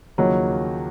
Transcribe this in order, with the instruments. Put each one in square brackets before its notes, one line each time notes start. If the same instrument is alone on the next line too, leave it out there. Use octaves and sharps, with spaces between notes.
[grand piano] D#2 C#3 F3 A#3 D#4 [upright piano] F#3